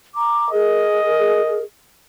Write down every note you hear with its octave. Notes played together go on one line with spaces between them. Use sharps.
A#5 D6
G#4 A#4 D#5